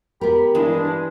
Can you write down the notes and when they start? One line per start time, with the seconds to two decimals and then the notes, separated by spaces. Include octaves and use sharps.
0.21 B3 G4 A#4 B5
0.55 G2 E3 G#3 D4